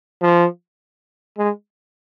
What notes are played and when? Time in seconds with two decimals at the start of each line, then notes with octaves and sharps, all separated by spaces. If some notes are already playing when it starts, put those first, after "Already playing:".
0.22 F3
1.38 G#3